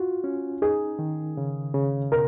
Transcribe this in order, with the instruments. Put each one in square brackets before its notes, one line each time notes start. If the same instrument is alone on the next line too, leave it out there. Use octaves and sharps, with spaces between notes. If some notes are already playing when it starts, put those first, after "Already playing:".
Already playing: [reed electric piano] F4 [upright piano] F#4
[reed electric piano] C#4
[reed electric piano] D#4 [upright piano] G#4
[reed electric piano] D#3
C#3
C#3
[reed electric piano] B2 [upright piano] A#4